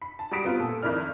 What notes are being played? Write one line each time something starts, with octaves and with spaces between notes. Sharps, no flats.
B5
A5
G3 F#4 A#5 D#6 B6 D7
B3 C4 F4 B4
A#2 A4
G#1 F2 E4 A#4 D5 F6